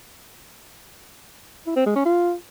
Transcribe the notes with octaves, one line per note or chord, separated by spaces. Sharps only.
E4
C4
G#3
C#4
F4